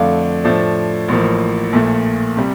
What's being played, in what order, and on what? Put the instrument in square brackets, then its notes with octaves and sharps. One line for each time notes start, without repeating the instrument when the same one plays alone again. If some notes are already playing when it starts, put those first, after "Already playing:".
Already playing: [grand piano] F2 D3 A3 D4 [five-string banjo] F5
[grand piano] A2 F3 A3 D4
A1 A2 F3 A#3
A#1 A#2 A3
C3 G3